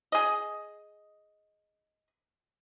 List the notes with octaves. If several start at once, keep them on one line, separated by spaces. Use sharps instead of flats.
G#4 D#5